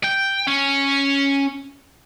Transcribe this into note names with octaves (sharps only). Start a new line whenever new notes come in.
G5
C#4